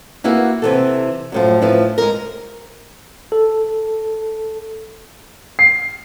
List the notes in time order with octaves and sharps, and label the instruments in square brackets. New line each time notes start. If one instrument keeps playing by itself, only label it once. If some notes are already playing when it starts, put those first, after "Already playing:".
[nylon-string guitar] A#3 E4 F#4 G#4 B4
C3 E3 A4
F#2 A2 F3
A2 F3 E4 B4
G#3 A#4
[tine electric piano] A4
[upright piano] C7